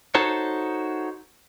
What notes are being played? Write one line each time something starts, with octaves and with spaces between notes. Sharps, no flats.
D#4 F#4 A4 C5 C#5